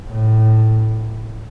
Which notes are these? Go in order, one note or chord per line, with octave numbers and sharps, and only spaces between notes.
A2